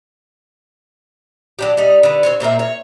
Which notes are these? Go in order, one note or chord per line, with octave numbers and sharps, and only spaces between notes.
F#3 D4 G4
G3 D#4
D3 B4
C4 C5 C#5
A#2 C4 A#4 E5
C#5